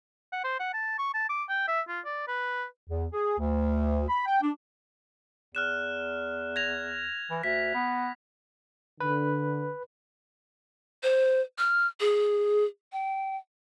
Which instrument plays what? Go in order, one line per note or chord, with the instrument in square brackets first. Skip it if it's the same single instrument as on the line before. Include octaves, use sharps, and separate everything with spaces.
[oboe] F#5
C5
F#5
A5
C#6
A5
D6
G5
E5
F4
D5
B4
[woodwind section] E2
G#4
D2
B5
G5
D4
[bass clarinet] E2 [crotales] F6 F#6 E7
[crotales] G#6 A#6 F7
[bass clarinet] E3
[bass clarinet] D2 [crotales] B6
[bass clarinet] B3
[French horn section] D3 [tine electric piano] B4
[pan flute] C5
F6
G#4
G5